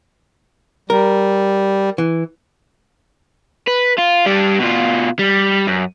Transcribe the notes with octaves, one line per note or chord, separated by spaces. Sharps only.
G3 A#4
E3
B4
F4
G3 D4
B2 F4
G3
F#2